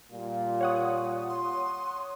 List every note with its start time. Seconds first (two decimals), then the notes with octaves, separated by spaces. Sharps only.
0.12 A#2 G3 F4
0.61 C#5 F#5 D#6
1.29 C6